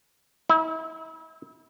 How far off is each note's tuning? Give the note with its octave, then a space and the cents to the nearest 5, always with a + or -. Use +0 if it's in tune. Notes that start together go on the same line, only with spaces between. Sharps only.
E4 -40